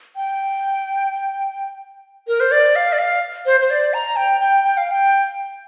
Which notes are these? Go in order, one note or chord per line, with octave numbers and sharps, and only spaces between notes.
G5
A#4
C5
D5
F5
D5
F5
C5
C5
D5
A#5
G5
G5
G5
F5
G5